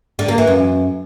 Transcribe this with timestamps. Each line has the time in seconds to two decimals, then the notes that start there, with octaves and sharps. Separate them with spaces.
0.19 D3
0.28 A#3
0.38 E3
0.47 F#2